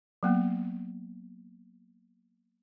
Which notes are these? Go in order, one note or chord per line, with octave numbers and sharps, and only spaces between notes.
F#3 A#3 B3